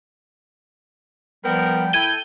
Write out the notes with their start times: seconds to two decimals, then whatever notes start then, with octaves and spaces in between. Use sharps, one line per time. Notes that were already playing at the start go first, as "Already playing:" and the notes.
1.44 F3 G3 B3 A#4 G5
1.93 E4 A4 G5 G#6 D#7 G7